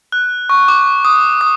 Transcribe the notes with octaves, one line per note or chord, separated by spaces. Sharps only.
F#6
C#6
D6
D#6
D#6